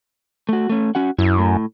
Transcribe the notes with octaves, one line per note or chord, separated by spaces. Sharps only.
A3 F#4
A3 C#4
C#4 F#4 F#5
F#2 E4
A2